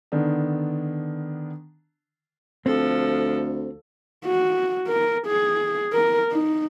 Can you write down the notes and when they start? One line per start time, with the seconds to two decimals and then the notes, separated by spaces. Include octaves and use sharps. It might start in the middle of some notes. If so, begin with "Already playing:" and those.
0.12 D3 D#3 B3 D4
2.66 D2 F3 C4 A4
4.25 F#4
4.87 A#4
5.27 G#4
5.93 A#4
6.32 D#4